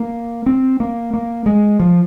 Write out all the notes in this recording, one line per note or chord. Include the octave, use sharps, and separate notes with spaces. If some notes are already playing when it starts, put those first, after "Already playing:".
Already playing: A#3
C4
A#3
A#3
G#3
F3